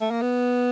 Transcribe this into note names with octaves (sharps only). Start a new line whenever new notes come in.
A3
A#3
B3